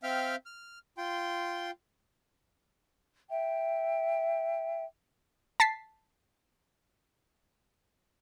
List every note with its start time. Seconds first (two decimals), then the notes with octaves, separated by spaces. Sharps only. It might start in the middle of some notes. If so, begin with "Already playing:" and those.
0.03 C4 E5 F5 G5 F6
0.46 F6
0.98 F4 G5 C6
3.30 E5 G5
5.60 A5 A6 B6 C7